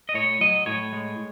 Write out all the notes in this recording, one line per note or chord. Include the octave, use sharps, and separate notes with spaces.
D#5
A2 C#5
F#3 D#5
A2 C#5
G#3